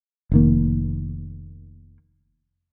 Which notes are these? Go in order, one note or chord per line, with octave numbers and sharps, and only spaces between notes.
F1 D#3 A#3